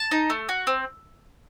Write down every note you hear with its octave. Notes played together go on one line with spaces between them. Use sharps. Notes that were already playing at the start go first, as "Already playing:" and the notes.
Already playing: A5
D#4
A3
F#4
C4